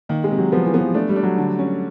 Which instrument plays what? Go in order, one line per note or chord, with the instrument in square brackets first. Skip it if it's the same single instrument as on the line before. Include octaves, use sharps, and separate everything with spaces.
[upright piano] D#3 [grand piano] A#3
[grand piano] G#3
[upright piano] C3
[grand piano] F#3
[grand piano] F3 [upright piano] B3
[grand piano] E3
[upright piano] B3
[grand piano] F3
[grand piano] A3 [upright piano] D4
[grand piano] G3
[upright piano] D4
[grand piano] F#3
[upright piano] D3
C#4